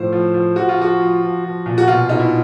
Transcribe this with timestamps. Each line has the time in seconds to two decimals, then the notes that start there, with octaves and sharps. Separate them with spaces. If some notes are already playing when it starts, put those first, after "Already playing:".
Already playing: A2 F3 C5
0.12 F3
0.34 F3
0.56 F3 F#4
0.69 F4
0.77 F3 F#4
1.00 F3
1.21 F3
1.44 F3
1.66 A#2
1.78 F#4
1.88 B2 F4
2.09 B2 D#4
2.19 E4